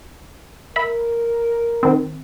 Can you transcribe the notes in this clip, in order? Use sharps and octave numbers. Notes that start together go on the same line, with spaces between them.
A#4 E5 B5
D#3 C4